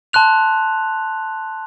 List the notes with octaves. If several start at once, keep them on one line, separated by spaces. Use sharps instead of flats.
A5 C6 F#6 F7